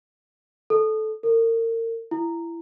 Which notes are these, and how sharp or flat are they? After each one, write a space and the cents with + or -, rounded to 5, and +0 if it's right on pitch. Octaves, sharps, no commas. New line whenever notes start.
A4 -15
A#4 -35
E4 +25